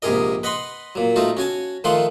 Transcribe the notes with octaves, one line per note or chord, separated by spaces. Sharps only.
A#1 G#2 C3 G#4 A#4 D#5
B4 D#5 F#5 B5 C6
A#2 F#3
F#3 A3 D#4 F4 F#4
C#4 F#4 G#5 A5
D#3 F3 A3 F4 F#5 C6